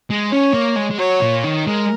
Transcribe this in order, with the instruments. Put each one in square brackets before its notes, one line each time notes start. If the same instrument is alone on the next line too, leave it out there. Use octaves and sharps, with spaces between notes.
[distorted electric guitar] G#3
[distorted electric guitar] C#4 [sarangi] C#5
[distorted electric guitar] A#3
G#3
G#3
[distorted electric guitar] F#3 [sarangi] C#5
[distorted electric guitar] A#2
D#3
[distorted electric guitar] G#3 [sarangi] A#4